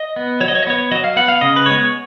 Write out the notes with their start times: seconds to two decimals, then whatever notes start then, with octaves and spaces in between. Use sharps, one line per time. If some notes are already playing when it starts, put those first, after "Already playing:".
Already playing: D#5
0.16 B3
0.41 F#3 C#5
0.48 D#5
0.55 C#5
0.63 D#5
0.67 B3 C#5
0.92 F#3 D#5
1.04 F5
1.16 B3 F#5
1.28 F5
1.41 C#3 D#5
1.56 B4
1.66 G#3 B3 C#5